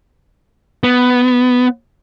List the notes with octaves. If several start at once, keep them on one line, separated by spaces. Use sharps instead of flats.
B3